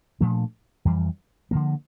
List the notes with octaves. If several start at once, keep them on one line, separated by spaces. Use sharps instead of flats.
A#2 F3 A3 D4
F2 E3 G3
D3 F3 A#3